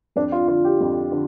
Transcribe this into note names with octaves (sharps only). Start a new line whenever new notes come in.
F2 D4
F4
D3 F4
G4
F2
D3